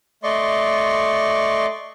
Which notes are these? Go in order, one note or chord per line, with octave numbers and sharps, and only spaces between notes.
A3 D5 D#5 C6 C#6